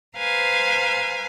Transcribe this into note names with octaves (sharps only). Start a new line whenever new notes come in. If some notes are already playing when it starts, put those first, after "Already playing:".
B4 C5 F5 G#5 A#5